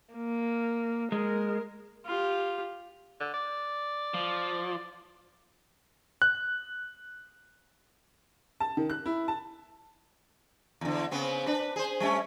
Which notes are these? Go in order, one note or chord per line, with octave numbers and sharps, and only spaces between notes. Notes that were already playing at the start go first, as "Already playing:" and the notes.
A#3
G#3 A#4
F4 G4
D3
D5
F3
F#6
A5
D#3
F#6
E4
A5
E2 D3
C#3 B3 C4
D4 B4
G#4 C5
G3 A3 C#4